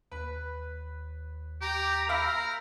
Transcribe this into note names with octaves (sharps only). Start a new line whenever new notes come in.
D#2 B4
G4 A#5
A#4 E5 F5 B5